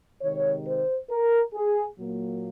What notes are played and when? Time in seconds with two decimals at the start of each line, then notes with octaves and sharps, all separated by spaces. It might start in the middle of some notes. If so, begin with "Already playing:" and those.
0.22 C3 D#3 G#3 C#5
0.66 C5
1.10 A#4
1.54 G#4
1.98 A#2 F#3 A#3